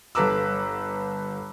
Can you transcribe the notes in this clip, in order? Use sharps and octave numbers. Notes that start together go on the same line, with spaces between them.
G1 A4 B4 A#5 D6 E6